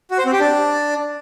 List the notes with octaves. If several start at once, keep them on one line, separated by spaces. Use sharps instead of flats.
F#4
C5
C4
G4
D4